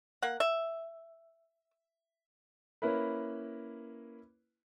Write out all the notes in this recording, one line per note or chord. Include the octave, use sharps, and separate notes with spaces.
A#3 F#5
E5
A#3 C#4 E4 A#4 B4